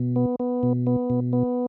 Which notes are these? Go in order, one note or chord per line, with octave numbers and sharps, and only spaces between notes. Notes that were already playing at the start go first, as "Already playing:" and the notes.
Already playing: B2
B3
B3
B2
B3
B2
B3